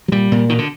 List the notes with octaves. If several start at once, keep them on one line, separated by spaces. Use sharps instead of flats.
F#3
A#2 G3
A#2
B2 D#3
D3